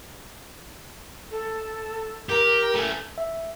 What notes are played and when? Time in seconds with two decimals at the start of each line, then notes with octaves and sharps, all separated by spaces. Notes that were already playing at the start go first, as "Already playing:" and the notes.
1.31 A4
2.29 G4 A#4
2.75 A3 C#4
3.18 E5